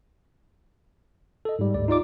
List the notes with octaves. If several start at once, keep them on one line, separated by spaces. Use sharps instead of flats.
A4 D#5
G#2 G3
D2 D5
D#4 F4 D5 D6